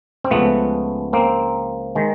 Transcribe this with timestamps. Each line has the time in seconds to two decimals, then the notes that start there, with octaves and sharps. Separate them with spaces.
0.24 C4
0.31 C#2 C#3 F3 A3 B3
1.13 A#3 C4
1.95 D#3 G#3